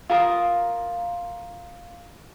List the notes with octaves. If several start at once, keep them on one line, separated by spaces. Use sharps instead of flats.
F4 A#4 D#6